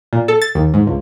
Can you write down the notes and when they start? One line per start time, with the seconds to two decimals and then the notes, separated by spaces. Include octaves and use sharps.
0.13 A#2
0.28 A4
0.42 A6
0.55 D#2
0.74 G#2
0.87 C#2